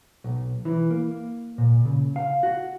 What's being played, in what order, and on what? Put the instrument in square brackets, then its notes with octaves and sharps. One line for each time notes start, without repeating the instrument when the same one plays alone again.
[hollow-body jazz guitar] B1
E3
A#3
A#2
C#3
F5
F#4